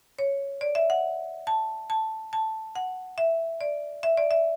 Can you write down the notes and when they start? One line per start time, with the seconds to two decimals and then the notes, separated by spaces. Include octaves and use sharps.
0.19 C#5
0.61 D5
0.75 E5
0.90 F#5
1.47 A5
1.90 A5
2.33 A5
2.76 F#5
3.18 E5
3.61 D5
4.03 E5
4.17 D5
4.31 E5